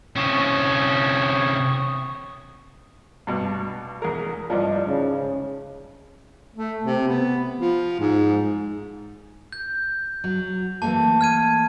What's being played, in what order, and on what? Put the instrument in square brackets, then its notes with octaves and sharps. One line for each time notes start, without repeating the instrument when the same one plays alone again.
[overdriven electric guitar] C3 C#4 [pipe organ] C#6 D#6
[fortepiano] G2 B2
E2 G#4 A#4
[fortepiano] G2 F3 [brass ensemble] E4 D5 D#5
[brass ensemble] G#2 C#3
[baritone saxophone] A3
C3
B3
F3
G#2
[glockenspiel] G6
[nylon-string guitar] F#3
[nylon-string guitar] E3 A3 A#3 [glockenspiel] A5
[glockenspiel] F6 G#6 D#7